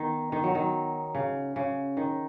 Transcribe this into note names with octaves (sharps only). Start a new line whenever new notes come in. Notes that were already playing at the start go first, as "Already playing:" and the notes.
Already playing: D#3 B3
D#3
F#3
D#3
C#3
C#3
D#3